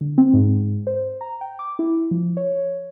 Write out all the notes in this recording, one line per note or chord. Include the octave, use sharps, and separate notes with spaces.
D3
C4
G#2
C5
A#5
G5
D6
E4
F3
C#5